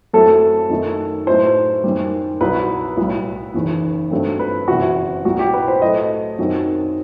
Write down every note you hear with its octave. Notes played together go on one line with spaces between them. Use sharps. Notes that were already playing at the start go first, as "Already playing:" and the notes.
F#2 F#3 A3 C4 E4 A4
F#2 D#3 F#3 A3 D#4
A2 F#3 B3 D#4 C5
F#2 D#3 G3
C2 B2 F#3 B3 B4
B1 A2 G3
F#1 E2 D#3
G2 F#3 A3 C4
B4
F#1 E2 C3 E3 F#4
C2 B2 G3 F#4
G4
B4
C5
A2 F#3 A3 D#5
F#2 D#3 F#3 C4 D#4